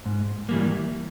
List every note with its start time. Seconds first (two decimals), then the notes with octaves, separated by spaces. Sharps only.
0.06 G#2
0.49 E3 G3 A#3